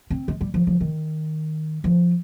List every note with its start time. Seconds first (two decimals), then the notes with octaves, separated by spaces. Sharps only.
0.10 C4
0.28 G#3
0.41 G3
0.54 F3
0.67 F3
0.80 D#3
1.84 F3